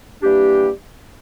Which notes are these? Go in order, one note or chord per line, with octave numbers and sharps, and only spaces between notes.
E3 G3 A#3 D4 G4